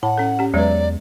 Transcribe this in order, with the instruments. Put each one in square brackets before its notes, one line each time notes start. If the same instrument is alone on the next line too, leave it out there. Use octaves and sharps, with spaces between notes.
[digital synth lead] A2 [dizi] F#5 [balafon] A5
[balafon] C#4 A4
C#4 G4
[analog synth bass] E2 [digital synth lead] F#3 [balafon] G#3 B4 [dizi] D5